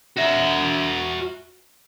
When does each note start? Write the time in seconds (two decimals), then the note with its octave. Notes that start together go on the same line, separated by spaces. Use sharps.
0.17 F#4 E5